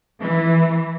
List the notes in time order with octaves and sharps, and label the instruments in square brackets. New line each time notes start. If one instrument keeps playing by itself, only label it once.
[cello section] E3